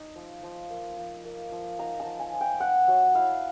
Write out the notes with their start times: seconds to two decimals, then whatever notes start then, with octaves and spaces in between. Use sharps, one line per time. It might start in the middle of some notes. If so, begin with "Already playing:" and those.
Already playing: D#4
0.16 F3
0.43 F3
0.70 A#3
0.97 F3
1.25 A#3
1.52 F3
1.79 D#4 A#5
2.00 A5
2.06 F3
2.19 G#5
2.33 F3
2.41 G5
2.60 B3 F#5
2.87 F#3 F#5
3.15 E4 F5